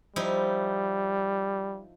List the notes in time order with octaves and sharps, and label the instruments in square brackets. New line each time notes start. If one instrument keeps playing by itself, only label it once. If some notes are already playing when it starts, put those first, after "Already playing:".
[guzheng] F3 D#4 E4 [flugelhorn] G3